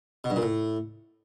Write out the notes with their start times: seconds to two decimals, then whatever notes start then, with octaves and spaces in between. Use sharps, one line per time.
0.24 B2
0.30 G2
0.36 A#2
0.42 A2